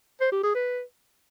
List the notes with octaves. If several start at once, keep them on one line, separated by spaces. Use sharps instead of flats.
C5
G4
G#4
B4